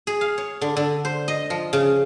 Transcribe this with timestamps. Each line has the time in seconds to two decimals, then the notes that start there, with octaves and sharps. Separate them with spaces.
0.07 G#4
0.21 F5
0.38 C#5
0.61 D3
0.77 D3
1.05 C5
1.28 D#5
1.50 F3
1.73 C#3